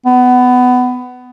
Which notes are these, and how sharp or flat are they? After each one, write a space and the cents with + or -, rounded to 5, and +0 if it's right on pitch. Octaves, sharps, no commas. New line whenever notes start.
B3 +20